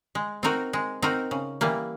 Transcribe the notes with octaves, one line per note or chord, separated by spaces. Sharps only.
G#3
C4 D#4 F#4 A#4
G#3
C4 D#4 F#4 A#4
C#3
E3 G3 A#3